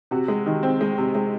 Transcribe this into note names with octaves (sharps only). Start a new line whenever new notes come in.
C3 F#4
G#3
D#3
C4
G#3
C3
G#3